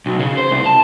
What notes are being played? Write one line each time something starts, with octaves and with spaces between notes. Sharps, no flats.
B1
C#3
C5
C2
A5